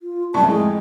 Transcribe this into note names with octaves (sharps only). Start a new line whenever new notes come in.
F4
C2 F#2 A5 C#6
F2 A2 G#3